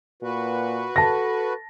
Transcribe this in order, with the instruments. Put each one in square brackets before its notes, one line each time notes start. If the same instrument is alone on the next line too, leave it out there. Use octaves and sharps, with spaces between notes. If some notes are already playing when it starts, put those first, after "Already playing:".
[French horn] A#2 [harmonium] F#4 B4
[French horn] A4 [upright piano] A5 A#6